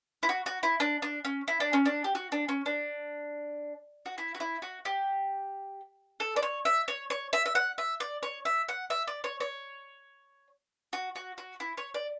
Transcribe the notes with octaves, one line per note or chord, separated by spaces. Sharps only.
E4
F#4
F#4
E4
D4
D4
C#4
E4
D4
C#4
D4
G4
F#4
D4
C#4
D4
F#4
E4
F#4
E4
F#4
G4
A4
D5
C#5
E5
C#5
C#5
E5
E5
F#5
E5
D5
C#5
E5
F#5
E5
D5
C#5
C#5
F#4
F#4
F#4
E4
C#5
D5